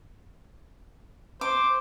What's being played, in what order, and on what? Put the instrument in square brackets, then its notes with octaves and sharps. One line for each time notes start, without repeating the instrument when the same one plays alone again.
[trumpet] C5 [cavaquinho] D6